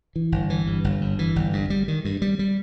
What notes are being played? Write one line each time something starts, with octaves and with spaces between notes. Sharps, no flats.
E3
G1
E3
G2
G1
G2
E3
G1
G2
G3
D#3
G2
G3
G3